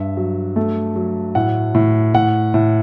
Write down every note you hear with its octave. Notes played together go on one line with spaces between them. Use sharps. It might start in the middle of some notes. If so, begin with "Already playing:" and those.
Already playing: G2 E5
F#3
A3
F#3
A2 F#5
A2
A2 F#5
A2